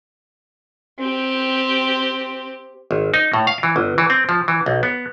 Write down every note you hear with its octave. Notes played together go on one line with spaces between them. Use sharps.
C4 G4
G#1
D#4
A2
F5
E3
G1
E3
C4
F3
E3
B1
B3